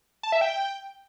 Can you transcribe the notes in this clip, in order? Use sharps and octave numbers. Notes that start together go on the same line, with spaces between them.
A5
E5
G5